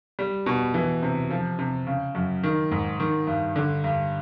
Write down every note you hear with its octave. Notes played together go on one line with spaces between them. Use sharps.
G3
B2
E3
C3
F3
C3
C#3
F#2
D#3
G#2
D#3
G2
D3
G2